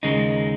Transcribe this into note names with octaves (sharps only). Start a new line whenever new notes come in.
D#2 C#3 G#3 D#4